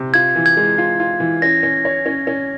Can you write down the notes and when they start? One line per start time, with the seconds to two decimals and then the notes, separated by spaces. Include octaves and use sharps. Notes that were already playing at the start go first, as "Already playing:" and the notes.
Already playing: C3
0.14 F4 G#6
0.36 E3
0.46 G#6
0.57 G#3
0.78 F4
1.00 F4
1.20 E3
1.42 C#4 A#6
1.63 C#4
1.85 C#5
2.06 C#4
2.27 C#4